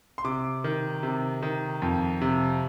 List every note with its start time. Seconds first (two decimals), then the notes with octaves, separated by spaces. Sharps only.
0.18 C6
0.24 C3 D6
0.64 D#3
1.03 C3
1.43 D#3
1.82 F2
2.22 C3